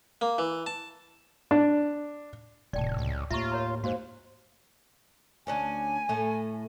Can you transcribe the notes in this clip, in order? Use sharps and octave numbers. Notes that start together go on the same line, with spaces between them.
A#3
E3
A5
D4
D#1 A2 C3 D5 G5 A5
C#2
D#2 A2 F4 E5 A#5 C#6
A#4 C#5 A#5
G#2 A#3 F#4 C5
D2 C#4 D4 G#5
A2 A3